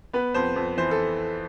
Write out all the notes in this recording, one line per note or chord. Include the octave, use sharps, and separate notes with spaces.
B3 B4
F2 C5
F2
E3 C5
A4